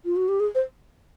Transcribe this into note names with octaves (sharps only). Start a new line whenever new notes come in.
F4
F#4
G4
G#4
C5